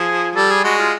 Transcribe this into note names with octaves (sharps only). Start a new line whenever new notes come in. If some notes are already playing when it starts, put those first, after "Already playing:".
Already playing: F3 G#4
G3 A4
G#4
G#3 F#4
F4